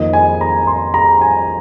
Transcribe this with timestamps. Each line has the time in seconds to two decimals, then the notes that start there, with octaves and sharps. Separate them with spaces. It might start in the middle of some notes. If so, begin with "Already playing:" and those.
Already playing: F2 D#3 A#3 D#5
0.13 G#5
0.41 A#5
0.67 C6
0.94 A#5
1.21 G#5